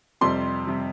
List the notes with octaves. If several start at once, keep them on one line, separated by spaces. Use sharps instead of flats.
F2 C3 G3 C6
C3 G3